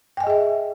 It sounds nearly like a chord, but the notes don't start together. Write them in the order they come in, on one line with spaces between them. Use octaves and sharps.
G5 G#5 D#5 G#4 E5